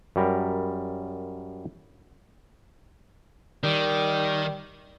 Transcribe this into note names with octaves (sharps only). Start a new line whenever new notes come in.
F#2 G3 A#4
D#3 G3